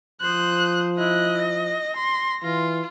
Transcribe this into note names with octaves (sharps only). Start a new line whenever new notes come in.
F3 C5 D#6 F#6
E4 D#5 F#6
A#6
C6
E3 F4